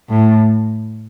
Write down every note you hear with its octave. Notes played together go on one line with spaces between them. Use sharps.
A2